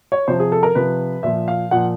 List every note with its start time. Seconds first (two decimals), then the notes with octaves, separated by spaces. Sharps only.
0.12 C#5
0.28 C3 F3 C5
0.40 G#4
0.52 A4
0.63 A#4
0.75 C3 F3 B4
1.23 A#2 F3 E5
1.48 F5
1.71 A#2 F3 F#5